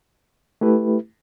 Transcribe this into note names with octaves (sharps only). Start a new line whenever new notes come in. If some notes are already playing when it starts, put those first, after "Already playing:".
A3 E4 G4 B4